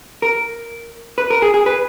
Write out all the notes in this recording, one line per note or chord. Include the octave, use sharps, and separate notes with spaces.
A#4
B4
A#4
G#4
G#4
B4